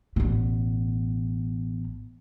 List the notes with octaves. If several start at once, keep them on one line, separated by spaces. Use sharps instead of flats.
A1 B2